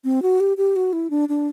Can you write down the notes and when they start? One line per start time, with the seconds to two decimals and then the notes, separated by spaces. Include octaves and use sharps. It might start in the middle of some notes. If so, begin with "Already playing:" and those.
0.04 C4
0.22 F#4
0.40 G4
0.57 G4
0.76 F#4
0.93 E4
1.10 D4
1.29 D4